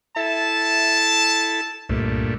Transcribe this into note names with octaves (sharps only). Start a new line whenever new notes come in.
E4 A4 E5 A5
C2 G2 A#2 A3